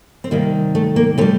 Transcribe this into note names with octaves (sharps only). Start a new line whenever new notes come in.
C4
C3 D#3 G3 A#3
A3
A#3
C3 G3 A3 C4